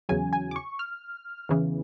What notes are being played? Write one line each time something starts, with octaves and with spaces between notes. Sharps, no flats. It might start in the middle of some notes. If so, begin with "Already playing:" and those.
E2 C#3 F#3 G#5
G#5
D6
C#6
F6
E2 C#3 E3